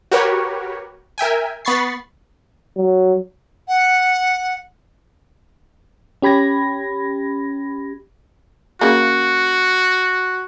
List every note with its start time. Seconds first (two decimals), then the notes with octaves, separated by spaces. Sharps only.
0.11 F#4 G4 A#4 B4 C#5
1.18 A#4 E5 G5 G#5
1.65 B3 B5 C#6 A6 C7
2.77 F#3
3.68 F#5
6.22 C#4 G4 B5 G#6 A#6
8.81 C#3 F#3 A#3 F#4